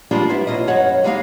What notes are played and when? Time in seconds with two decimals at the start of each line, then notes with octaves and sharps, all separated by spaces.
0.11 F3 G3 G#3 A#3 D4 F4
0.29 B3 E4 C5
0.47 D#2 B2 F4 D#5
0.67 F#2 C#5 D#5 F#5
1.04 G3 G#3 A#3 D#4 D#5 F5